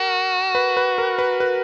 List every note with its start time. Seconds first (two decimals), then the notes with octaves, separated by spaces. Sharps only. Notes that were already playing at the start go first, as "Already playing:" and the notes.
Already playing: F#4 A#4
0.55 B4
0.77 B4
0.98 A#4
1.19 B4
1.40 B4